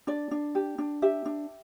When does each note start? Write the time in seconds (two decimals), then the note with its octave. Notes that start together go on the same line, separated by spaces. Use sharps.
0.07 D4 D5
0.31 D4
0.55 G4
0.78 D4
1.02 G4 E5
1.26 D4